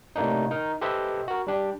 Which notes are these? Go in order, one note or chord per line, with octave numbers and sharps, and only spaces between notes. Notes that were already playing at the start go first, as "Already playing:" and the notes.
A2 C3 A#3 D4 D#4
D#4 A#4
G4 A4 B4 C5 D#5 E5
F#4 A#4
G3 D4 G4